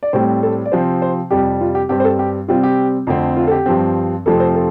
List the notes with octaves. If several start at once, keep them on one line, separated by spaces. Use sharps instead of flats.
D5
A2 G3 C4 C5
A4
D5
C3 F3 C4 C5
C5
F2 C3 G3 G4
F4
G4
G2 G3 C4 G4
C5
A4
G4
C3 G3 C4 F4
G4
F2 D3 A3 C4
F4
A4
G4
G2 F3 C4
F2 C3 F3 A3 C4 A4
C5
A4